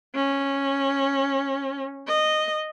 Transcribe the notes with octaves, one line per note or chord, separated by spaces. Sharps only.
C#4
D#5